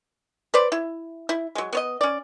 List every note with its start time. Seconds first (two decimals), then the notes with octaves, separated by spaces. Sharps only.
0.54 B4 C5 D5
0.72 E4
1.29 E4
1.55 F#3 G#3
1.73 B3 C#5 D#5
2.01 C#4 D5